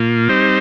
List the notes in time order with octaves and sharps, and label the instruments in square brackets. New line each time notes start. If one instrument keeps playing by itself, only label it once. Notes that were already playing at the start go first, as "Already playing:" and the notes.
Already playing: [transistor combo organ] A#2 A#3 F4
G3 C4 D#4 C5